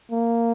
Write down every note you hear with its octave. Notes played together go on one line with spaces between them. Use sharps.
A#3